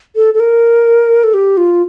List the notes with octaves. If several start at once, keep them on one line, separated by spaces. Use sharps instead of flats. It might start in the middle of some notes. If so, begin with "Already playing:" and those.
A4
A4
A#4
A4
G4
F4